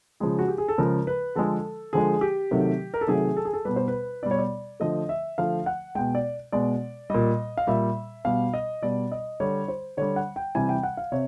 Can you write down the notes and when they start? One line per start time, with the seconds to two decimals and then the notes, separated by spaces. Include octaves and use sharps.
0.20 C#3 F3 G#3 G#4
0.39 F#4
0.48 G4
0.58 G#4
0.68 A4
0.78 C#3 F3 G#3 A#4
1.07 B4
1.35 D3 F3 G#3 A4
1.93 D3 F3 G#3 G#4
2.21 G4
2.51 C3 D#3 F#3 A3
2.94 A#4
3.01 A4
3.07 C3 D#3 F#3 A3 G#4
3.37 A4
3.45 G#4
3.53 A4
3.65 B2 G3 B4
3.76 C5
3.88 B4
4.23 B2 G3 D5
4.31 C#5
4.39 D5
4.80 D3 F3 A3 D#5
5.09 E5
5.38 D3 F3 A3 F5
5.66 F#5
5.95 B2 G#3 G5
6.15 D5
6.52 B2 G#3 D5
7.10 A#2 G3 D#5
7.57 F5
7.67 A#2 G3 E5
8.25 B2 G3 F5
8.54 D#5
8.82 B2 G3 D5
9.12 D#5
9.40 D3 G3 C#5
9.68 C5
9.97 D3 G3 C#5
10.16 F#5
10.36 G5
10.55 C3 E3 G3 G#5
10.69 G5
10.83 F#5
10.97 F5
11.12 C3 C#5